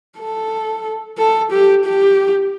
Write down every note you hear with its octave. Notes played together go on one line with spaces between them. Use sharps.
A4
A4
G4
G4